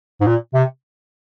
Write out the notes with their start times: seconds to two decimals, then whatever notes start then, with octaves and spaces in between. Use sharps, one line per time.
0.21 G#2
0.26 A#2
0.54 C3